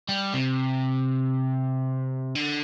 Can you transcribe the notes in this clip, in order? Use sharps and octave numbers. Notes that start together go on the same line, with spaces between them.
G3
C3
D3